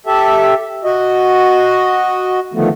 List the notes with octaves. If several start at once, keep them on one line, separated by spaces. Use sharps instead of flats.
G4 A4 E5
F#4 D#5
D3 D#3 F3 A3 B3